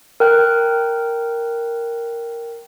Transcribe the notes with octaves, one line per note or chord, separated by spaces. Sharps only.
A#4 G5 F#6